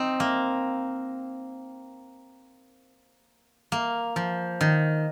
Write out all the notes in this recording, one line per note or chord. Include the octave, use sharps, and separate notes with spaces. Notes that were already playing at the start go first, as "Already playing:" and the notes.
Already playing: C4 D#4
A#3
A#3
F3
D#3